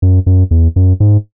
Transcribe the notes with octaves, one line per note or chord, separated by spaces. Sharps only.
F#2
F#2
E2
F#2
G#2